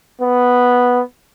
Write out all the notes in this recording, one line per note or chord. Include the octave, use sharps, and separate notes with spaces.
B3